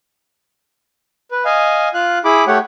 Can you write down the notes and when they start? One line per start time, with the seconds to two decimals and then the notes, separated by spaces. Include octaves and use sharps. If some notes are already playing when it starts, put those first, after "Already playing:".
1.31 B4
1.45 D#5 F5 G#5
1.94 F4 F5 F#6
2.25 E4 G#4 B5 D6
2.47 A3 G4 C#5 F#5